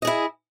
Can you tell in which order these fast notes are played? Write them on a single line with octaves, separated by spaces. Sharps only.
D#5 G#4 E4